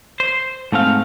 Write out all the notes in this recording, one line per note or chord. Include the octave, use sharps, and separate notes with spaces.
C5
G#2 A3 C4 F5